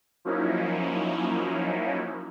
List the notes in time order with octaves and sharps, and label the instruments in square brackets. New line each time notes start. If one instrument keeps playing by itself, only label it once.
[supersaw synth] F3 F#3 A#3 C#4 D#4 E4